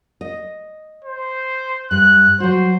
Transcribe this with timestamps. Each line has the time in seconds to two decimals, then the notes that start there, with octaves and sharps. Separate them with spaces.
0.21 D#5
1.05 C5
1.91 G2 F#6
2.40 F#3 F#4 C5